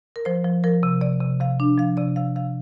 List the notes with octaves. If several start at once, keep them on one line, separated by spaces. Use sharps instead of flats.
A#4
F3 C5
F3
F3 A#4
C3
C3 D5
C3
C3 F5
D4
F3 F5
C3 D5
C3 F5
C3 F5